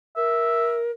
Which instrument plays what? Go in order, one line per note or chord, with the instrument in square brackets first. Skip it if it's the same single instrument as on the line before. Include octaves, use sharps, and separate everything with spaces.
[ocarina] A#4 [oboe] E5